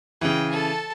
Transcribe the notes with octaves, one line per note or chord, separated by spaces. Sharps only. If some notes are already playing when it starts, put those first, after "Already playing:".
C#3 E3 G5
A4 A5